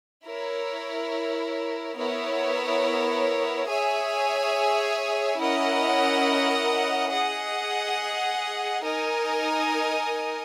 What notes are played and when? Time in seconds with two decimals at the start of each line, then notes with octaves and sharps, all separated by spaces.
0.24 E4 A#4 C#5
1.96 B3 E4 A#4 C#5
3.67 G#4 C#5 E5 G#5
5.38 C#4 E4 A#4 D#5 F#5
7.10 G#4 D#5 F#5
8.82 D#4 A#4 D#5 G#5